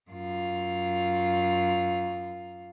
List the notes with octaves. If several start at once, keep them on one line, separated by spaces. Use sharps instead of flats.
F#2 F4